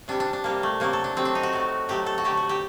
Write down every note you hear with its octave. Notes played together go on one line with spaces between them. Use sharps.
C3 G3 D4
D4
D4
C3 G3 A#3
A3
C3 F#3 A3 A#3
A4
D4
C3 F#3 A3 C4
D4
D#4
F#4
A2 F#3 A3
A2 F#3 A3 G4
A4
F#4
D3 F#3 A3 G4
F#4
G4